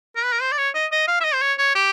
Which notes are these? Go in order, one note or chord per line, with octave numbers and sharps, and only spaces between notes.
A#4
B4
A#4
C5
D5
C#5
D#5
D#5
F5
E5
D#5
C5
C#5
C#5
G4